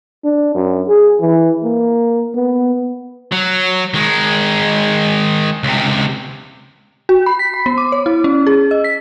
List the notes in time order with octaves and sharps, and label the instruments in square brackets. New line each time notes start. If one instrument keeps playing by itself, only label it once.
[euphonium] D4
F#2
G#4
E3
A#3
B3
[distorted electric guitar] F#3
D#3 G#3
C#2 C3
[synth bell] F#4
B5
B6
B5
B3
D6
C#5
E4
C#4
G#4
D#5
B6